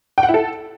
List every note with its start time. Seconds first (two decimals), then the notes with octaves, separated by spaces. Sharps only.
0.18 G5
0.23 F#5
0.29 E4
0.34 A4